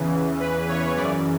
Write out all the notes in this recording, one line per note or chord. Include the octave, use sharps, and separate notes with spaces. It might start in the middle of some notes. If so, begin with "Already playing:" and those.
Already playing: E2 C#3 E3
B4
C#5
F#2 C#3 E3 D5